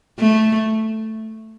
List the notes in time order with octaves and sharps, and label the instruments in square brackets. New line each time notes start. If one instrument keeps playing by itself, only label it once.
[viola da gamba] A3